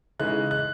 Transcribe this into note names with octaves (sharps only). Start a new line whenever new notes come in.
C#3 E3 G#3 D#4 F#6
F#6